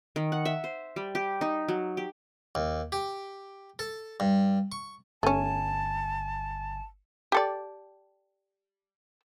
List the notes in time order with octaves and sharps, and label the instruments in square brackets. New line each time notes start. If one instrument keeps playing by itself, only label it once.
[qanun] D#3
F#5
E5
C5
G3
G4
D#4
F#3
G4
[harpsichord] D#2
G4
A4
G2
C#6
[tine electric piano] G1 G#5 [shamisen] A3 C#4 [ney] A5
[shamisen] G4 A4 D5